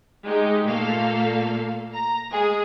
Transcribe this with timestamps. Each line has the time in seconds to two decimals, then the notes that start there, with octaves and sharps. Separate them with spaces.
0.24 G#3 D#4 G4
0.64 A#2 A3 A#3 A4 F5
1.93 A#5
2.30 G#3 G#4